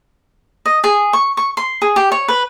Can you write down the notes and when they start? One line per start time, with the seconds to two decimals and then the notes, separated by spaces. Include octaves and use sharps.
0.66 D#5
0.84 G#4
1.13 C#6
1.37 C#6
1.57 C6
1.82 G#4
1.96 G4
2.12 C#5
2.28 B4